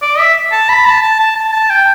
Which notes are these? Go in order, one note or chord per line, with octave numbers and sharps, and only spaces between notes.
D5
E5
A5
B5
A5
A5
A5
A5
A5
G5